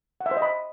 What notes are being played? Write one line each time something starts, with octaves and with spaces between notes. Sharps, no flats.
F#5
E5
C5
D#5
B5